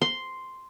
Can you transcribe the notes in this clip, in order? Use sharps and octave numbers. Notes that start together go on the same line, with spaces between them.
C6